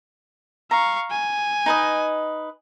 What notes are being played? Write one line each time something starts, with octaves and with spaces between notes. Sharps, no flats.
F5 A#5 C#6
G#5
D#4 B4 D#5